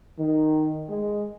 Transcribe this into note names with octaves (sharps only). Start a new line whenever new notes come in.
D#3
G#3